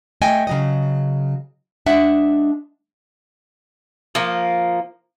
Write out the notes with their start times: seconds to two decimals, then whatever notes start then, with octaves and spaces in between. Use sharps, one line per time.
0.21 A3 D#5 G5 G#5
0.47 C#3 F#3 D#5
1.86 G#3 D4 E5 F#5
4.15 F3 A#3